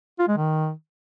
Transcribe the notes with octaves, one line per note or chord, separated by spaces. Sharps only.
F4
G#3
D#3